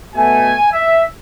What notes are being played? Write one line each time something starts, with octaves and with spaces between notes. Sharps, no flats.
B2 A3 G#5
E5